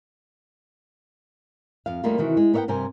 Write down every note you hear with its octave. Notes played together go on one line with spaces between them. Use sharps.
F2 F5
D#2 D#3 G3 A3 A#3 F4
C3 D#3 E3 F#4
G#3
B3 A#4 C#5 E5 F#5 G5
G2 C3 A#4 C5 G#5